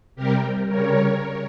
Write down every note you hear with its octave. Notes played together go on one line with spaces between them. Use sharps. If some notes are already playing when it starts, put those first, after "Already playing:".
C3 G3 G4 A#4
C#3 G3 A#4 C#5